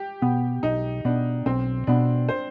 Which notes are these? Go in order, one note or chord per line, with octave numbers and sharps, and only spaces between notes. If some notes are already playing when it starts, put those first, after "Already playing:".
Already playing: G4
B2 B3
B1 D#4
B2 B3 D4
B1 C4
B2 B3 D4
C5